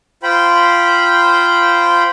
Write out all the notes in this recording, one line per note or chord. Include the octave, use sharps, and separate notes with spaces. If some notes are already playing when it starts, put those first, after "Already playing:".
F4 C5 G5 B5